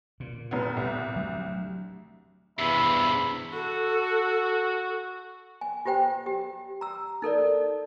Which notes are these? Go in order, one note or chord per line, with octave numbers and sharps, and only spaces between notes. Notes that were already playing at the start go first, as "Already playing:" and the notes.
A#2
F1 B3
C2
F#3 A3 D4
E2 G2 C3 E5 B5
F#4 A4
G#5
F4 G4 C5 G5
G4
A#5 E6
D#4 A4 A#4 D5